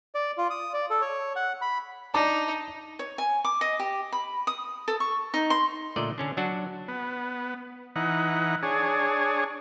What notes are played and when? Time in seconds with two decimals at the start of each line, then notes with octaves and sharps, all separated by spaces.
0.15 D5
0.38 F4
0.50 D#6
0.74 D5
0.90 A4
1.02 C#5
1.36 F#5
1.62 B5
2.14 D4 D#4 A5 D6
2.99 C#5
3.18 G#5
3.45 D6
3.61 D#5
3.79 G4
4.12 B5
4.47 D#6
4.88 A4
5.00 C#6
5.34 D#4
5.50 C6
5.96 A#2 D3 A3 D5 D#5
6.18 D3 C#4 D4
6.37 F#3 D4 F#4
6.88 B3
7.96 E3 D#4 F#5
8.63 D4 G#4 C#5